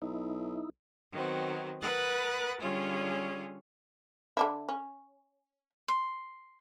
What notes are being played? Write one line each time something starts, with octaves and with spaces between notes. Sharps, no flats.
B1 D#4 E4
D#3 F#3 B3 C4
A#4 B4 F#5 D#6 F#6 A6
D3 G3 C#4 F4 G#4 C#5
D3 D4 E4
C#4
C6